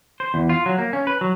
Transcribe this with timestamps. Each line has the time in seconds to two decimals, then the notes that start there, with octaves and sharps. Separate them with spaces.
0.20 C5
0.34 E2
0.49 F4
0.66 F#3
0.78 A#3
0.93 C#4
1.07 B4
1.21 F#3